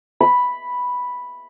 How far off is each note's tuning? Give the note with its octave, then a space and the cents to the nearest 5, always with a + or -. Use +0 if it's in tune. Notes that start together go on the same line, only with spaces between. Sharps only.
B5 +0